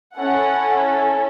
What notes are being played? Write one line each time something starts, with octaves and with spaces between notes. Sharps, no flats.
C#4 E4 A4 F#5